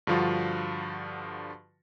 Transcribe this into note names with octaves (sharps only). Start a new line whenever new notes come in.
G2 D3 F3 F4 F#4